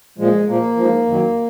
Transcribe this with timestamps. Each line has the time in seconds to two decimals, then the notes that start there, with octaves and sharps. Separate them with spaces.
0.18 A#2 F3 G#3
0.47 A#2 F3 A#3
0.76 G#2 F3
1.06 F#2 D#3 F#3